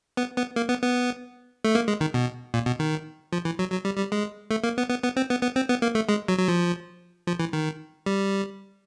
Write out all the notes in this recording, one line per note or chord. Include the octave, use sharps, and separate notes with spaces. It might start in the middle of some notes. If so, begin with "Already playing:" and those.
B3
B3
A#3
B3
B3
A3
A#3
G#3
D#3
B2
A#2
B2
D#3
F3
E3
F#3
F#3
G3
G3
G#3
A3
A#3
B3
B3
B3
C4
B3
B3
C4
B3
A#3
A3
G#3
F#3
F#3
F3
F3
E3
D#3
G3